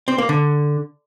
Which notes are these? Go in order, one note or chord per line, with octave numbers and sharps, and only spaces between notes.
C4
A#3
D3